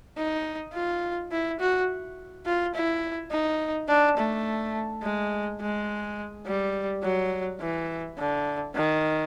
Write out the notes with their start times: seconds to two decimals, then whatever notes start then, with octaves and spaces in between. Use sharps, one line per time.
0.17 D#4
0.73 F4
1.31 E4
1.60 F#4
2.46 F4
2.74 E4
3.31 D#4
3.89 D4
4.17 A3
5.03 G#3
5.61 G#3
6.46 G3
7.03 F#3
7.61 E3
8.18 D3
8.75 D#3